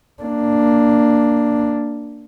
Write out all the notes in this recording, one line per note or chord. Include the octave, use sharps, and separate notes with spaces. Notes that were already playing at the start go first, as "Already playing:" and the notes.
A#3 D4